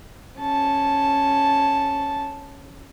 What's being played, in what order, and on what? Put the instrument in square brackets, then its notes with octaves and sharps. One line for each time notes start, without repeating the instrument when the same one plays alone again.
[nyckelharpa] C#4 A5